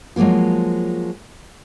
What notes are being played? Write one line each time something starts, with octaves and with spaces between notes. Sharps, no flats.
F3 F#3 G#3 A#3 F4